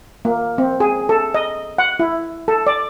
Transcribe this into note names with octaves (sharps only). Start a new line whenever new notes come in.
A#3
C4
G#4
A4
D#5
F#5
E4
A4
D5